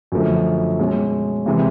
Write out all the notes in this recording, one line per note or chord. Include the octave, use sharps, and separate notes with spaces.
F#2 D3 F3 A3
B2 G#3 C#4
C3 E3 G#3